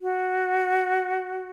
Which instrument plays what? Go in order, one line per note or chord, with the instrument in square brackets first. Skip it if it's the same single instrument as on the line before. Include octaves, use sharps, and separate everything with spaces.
[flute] F#4